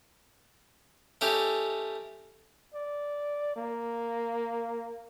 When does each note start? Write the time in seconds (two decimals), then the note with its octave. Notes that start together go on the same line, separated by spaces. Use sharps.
1.21 A3 C#4 D#4 E4 G4 A4
2.74 D5
3.56 A#3